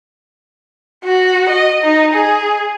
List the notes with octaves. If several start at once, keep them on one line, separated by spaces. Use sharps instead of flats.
F#4
D#5
D#4
G#4